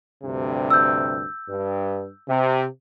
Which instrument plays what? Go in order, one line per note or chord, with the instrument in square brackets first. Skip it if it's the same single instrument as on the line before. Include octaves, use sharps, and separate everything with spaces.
[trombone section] D2 G2 C3
[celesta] E6 G6
[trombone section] G2
C3